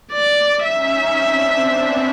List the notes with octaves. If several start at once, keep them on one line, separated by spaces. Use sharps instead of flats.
D5
C#4 D#4 E5
C4 D4
B3 C#4